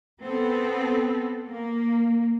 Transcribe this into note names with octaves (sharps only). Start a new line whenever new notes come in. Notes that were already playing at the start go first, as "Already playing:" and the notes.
B3 C4 A4
A#3